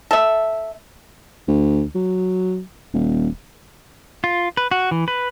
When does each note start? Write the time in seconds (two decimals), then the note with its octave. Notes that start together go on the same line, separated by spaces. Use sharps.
0.11 A4 E5
1.48 D2
1.95 F#3
2.93 D#1
4.24 F4
4.57 B4
4.71 F#4
4.91 E3
5.08 B4